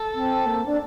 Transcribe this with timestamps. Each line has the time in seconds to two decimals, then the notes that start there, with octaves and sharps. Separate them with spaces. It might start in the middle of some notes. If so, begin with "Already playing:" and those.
Already playing: A4
0.14 C4
0.46 A#3
0.66 D4